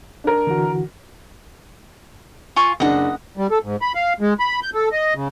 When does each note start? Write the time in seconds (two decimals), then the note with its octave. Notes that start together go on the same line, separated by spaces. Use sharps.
0.24 D4 A#4
0.47 D3 E3 F#4
2.56 F4 G#5 C#6
2.80 F#1 D4 D#5 F#5
3.37 G3
3.51 A4
3.63 G#2
3.82 B5
3.95 F5
4.21 G#3
4.39 B5
4.62 G6
4.74 A4
4.92 D#5
5.15 C#3